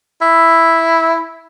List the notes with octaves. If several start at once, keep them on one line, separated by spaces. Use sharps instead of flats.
E4